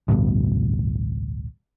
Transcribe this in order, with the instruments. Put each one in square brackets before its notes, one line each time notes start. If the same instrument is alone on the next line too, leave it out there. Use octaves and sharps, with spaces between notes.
[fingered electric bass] A1 D2 G2 B2